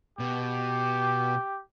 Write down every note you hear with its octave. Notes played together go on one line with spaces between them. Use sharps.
B2 G4